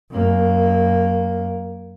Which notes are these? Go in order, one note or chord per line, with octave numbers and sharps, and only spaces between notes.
F#2 A#3